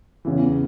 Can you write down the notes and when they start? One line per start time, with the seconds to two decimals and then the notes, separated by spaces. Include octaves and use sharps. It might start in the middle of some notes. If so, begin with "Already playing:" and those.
0.25 E2 C#3 E3